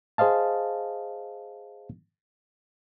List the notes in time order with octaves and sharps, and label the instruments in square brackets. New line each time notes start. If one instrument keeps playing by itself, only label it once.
[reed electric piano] G#4 C5 D#5 F5 A5